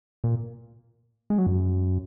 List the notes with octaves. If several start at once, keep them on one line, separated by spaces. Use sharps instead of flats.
A#2
G#3
F#3
F#2